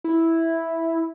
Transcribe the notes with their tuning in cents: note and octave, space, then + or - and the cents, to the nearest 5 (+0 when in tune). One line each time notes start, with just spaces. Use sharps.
E4 -5